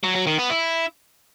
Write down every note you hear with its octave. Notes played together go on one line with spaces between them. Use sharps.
F#3
F#3
D#3
B3
E4